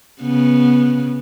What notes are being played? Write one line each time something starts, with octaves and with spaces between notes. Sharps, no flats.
C#3 B3